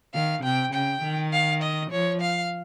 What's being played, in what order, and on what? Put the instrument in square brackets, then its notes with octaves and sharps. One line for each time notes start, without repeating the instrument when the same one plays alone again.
[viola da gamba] D#3 [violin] F5
[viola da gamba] C3 [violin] G5
[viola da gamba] C#3 [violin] G5
[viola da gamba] D#3
[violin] F5
D#5
[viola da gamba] F3 [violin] C#5
[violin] F5